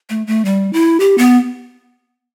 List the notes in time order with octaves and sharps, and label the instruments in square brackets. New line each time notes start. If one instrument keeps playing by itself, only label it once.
[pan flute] A3
A3
G3
E4
G4
B3